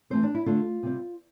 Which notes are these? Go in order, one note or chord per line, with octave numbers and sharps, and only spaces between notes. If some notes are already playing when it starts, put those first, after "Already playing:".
E3 A3 C4 C5
D4
E4
D3 A3 D4 F4
C3 G3 C4